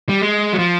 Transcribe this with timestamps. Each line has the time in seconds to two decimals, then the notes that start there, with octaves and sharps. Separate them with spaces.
0.09 G3
0.22 G#3
0.53 F#3
0.59 F3